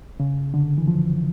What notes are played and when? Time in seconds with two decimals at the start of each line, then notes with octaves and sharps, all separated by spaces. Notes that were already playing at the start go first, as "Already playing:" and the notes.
0.20 C#3
0.54 D3
0.78 E3
0.88 F3